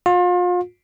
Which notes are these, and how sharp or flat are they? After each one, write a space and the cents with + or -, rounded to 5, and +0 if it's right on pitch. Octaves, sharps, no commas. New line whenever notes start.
F4 +35